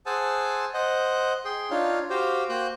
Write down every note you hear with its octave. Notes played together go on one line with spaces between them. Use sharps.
G#4 C5 F#5 G#5 A5 E6
C5 D#5 F#5
G#4 G5 C6
D4 D#4 F4 C#5 F5
F#4 G4 C5 F5 G5
A#3 F#4 C5 G5 F#6 G6